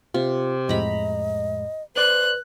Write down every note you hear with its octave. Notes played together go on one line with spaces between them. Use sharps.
C3 F4
F2 A2 G#3 D#5 A#5 B5
B4 C5 D5 C6 F#6